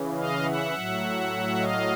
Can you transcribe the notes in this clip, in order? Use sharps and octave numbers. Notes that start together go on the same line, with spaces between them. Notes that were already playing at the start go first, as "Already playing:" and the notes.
Already playing: C#3 E3
D#5 F5
E5 F#5
A2 F#3
D#5 F5